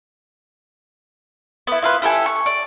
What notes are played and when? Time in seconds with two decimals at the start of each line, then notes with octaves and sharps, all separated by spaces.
1.67 B3 E4
1.82 E4 F4 B4
2.02 E4 G4 A4 G#5
2.26 C#6
2.46 D5